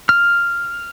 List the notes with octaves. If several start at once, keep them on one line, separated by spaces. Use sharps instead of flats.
F6